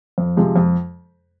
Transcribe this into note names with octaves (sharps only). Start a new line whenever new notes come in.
F2
C3 F3 G#3
F2